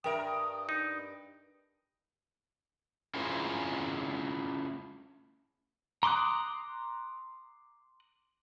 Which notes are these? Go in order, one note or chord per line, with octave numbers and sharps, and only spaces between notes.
G2 A#4 E5 G5 D#6
D#4
C#4 E4 F4 G#4 A#4 C5
A#5 C6 D6 D#6 F#6